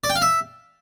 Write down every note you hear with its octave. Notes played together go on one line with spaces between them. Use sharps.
D5
G5
F5
E5